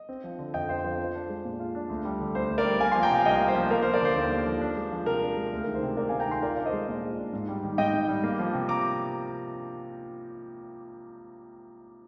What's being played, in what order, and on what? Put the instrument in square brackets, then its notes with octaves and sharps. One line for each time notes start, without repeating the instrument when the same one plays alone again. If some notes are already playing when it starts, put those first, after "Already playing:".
Already playing: [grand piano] D#5
C4
F3
D3
F2 D#5 G5
C4 C5 D#5
F3 C5
F4 C5
D4
G#3
A#2
F4
D4
D2
G3
D3
D2 C5
D2
A#4 D5
G3
A#3 F5 G#5
G#5 C6
F3
G5 A#5
C3 F5 G#5
C2 D#5 G5
A#3
C5
F3
A#3 A#4
C5
F3
A#4 D5
D3 C5
D#2
A#3
F3
D4
G#3
F3
C3 A#4
D4
G#3
D2
A#4
D#3
C5
C3
D2 A#4 D5
F5 G#5
D2
G5 A#5
D#3 G#5 C6
F4 A#4 D5
D5 F5
D4
C5 D#5
G#3
A#2
F4
D4
G#2
G3
D#3
G#2 D#5 G5
G#2
G3
A#3
F3
C3
A#5 D6